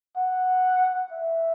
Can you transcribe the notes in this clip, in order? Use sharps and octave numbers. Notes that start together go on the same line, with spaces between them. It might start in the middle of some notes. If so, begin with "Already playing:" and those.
F#5
E5